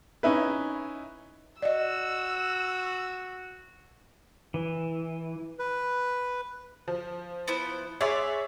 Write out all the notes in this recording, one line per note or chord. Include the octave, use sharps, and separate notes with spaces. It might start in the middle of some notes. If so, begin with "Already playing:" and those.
C#4 D#4 E4 B4
F#4 D5 D#5 E6
E3
B4
F3
B3 E4 C5
B3 G#4 C#5 D5 E5 C6